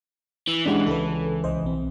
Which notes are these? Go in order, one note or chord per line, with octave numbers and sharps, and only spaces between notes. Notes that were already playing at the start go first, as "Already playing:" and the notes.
E3
G#3 C#4 D4 G4 F#5
C#2 A4 B4
C2 C5 D#5
B1 C4